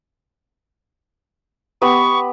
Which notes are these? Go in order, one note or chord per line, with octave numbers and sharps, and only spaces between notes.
B3 G4 B5 C#6